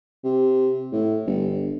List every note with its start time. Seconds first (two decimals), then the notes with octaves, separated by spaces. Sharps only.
0.24 C3
0.92 A2
1.26 G1